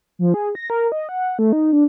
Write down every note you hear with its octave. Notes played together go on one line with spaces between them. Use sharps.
F3
G#4
A#6
A#4
D#5
F#5
A3
D#4
D4